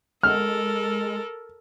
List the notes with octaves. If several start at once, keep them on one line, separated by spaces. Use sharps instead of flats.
G#3 A4 A#4 F6